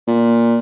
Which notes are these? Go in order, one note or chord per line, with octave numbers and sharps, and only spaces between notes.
A#2